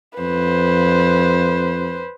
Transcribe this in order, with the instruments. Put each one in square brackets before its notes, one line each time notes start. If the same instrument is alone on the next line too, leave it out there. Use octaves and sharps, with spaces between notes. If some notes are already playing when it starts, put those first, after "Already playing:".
[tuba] F2 [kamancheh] B4 C5